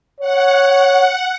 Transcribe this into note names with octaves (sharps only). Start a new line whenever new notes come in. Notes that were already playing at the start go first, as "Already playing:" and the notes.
C#5 F#5